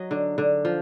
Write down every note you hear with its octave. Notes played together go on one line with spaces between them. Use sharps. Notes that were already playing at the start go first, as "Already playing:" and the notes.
Already playing: F#3 D#5
D3
D3
F3